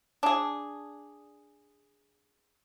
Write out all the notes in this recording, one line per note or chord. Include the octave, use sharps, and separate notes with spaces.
D4 G#4